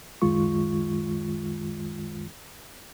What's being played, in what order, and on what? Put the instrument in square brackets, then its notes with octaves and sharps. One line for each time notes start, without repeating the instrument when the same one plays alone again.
[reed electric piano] C#2 F#2 D#3 G#3 F4 C#6